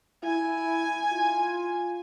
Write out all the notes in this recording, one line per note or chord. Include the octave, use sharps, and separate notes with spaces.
E4 G#5
F4